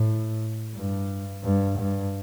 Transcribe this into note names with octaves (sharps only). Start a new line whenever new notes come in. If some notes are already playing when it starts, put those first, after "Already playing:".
Already playing: A2
G2
G2
G2